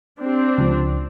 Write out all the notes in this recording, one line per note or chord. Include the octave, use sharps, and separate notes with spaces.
C4 D4 G4
C#2 F3